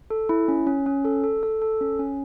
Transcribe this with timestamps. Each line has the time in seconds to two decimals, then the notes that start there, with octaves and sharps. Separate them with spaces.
0.10 A4
0.29 E4
0.48 C#4
0.67 C#4
0.86 C#4
1.05 A4
1.24 A4
1.43 A4
1.62 A4
1.81 C#4
1.99 C#4